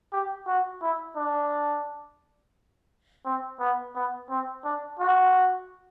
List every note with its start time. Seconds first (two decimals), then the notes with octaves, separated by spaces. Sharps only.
0.13 G4
0.47 F#4
0.82 E4
1.17 D4
3.25 C4
3.60 B3
3.96 B3
4.30 C4
4.65 D4
5.00 F#4